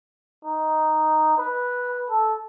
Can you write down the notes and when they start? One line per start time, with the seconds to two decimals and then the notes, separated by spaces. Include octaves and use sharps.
0.45 D#4
1.38 B4
2.10 A4